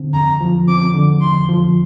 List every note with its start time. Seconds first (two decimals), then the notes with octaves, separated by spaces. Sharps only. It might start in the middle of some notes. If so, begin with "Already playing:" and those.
Already playing: D3 C4
0.13 F2 A#5
0.41 F3
0.68 C4 D6
0.94 D3
1.21 F2 C6
1.49 F3